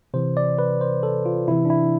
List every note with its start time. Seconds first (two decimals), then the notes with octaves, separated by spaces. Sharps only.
0.14 C3 E3 C5
0.37 D5
0.59 B4
0.81 C5
1.03 A4
1.26 F4
1.48 C3 E3 E4
1.65 D4
1.70 E4